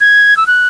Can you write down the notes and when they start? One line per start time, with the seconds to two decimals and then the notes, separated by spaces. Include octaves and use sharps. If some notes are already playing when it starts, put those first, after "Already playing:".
0.01 G#6
0.37 E6
0.47 F#6